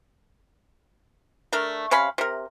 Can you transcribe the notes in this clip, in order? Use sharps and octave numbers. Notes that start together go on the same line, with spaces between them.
A3 D4 A#4
C3 C#4 F5 B5
C3 A#4